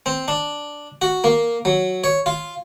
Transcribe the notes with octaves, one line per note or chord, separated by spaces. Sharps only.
C4
D4
F#4
A#3
F#3
C#5
F4